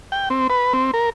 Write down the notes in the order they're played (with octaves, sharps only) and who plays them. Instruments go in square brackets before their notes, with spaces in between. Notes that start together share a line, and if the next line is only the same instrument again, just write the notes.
[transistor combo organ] G5
C4
B4
C4
A#4